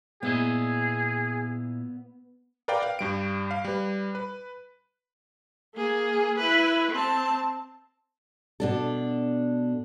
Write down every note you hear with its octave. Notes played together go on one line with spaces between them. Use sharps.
A#2 B3 E4 G#4 D#5
A#4 B4 D5 F5 G5
F5
G2 G3 D7
F5
G3 B4
B4
A#3 G#4
E4 B4
C4 A5
B2 D4 A4